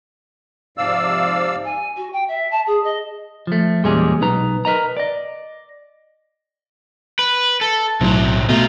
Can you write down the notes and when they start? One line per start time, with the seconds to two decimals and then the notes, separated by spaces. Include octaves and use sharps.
0.78 G#2 C3 F3 D5 F5 E6
1.65 G#5
1.97 F#4
2.13 G5
2.28 E5
2.51 A5
2.67 G#4
2.84 D#5
3.47 F3 A3
3.84 E2 A#2 G3 G#3 C#4 G#4
4.21 B1 D#4 B4 A#5
4.65 A#4 B4 D#5 A#5
4.97 D5 D#5
7.19 B4
7.61 A4
8.01 B1 A2 C3 F#3
8.49 B2 A3 D#4 F4